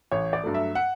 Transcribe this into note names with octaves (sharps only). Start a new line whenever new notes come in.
A1 C#5
D5
G2 F#3 A3
E5
F#5